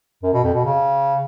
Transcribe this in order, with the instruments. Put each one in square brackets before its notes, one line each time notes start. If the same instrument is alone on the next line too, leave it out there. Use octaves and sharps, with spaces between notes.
[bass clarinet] F#2
B2
F2
B2
C#3